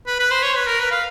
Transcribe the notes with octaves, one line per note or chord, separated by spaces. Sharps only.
B4
B4
C5
C#5
B4
A#4
B4
F5